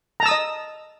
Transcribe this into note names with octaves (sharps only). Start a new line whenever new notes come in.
D#5 A5 A#5 D#6 E6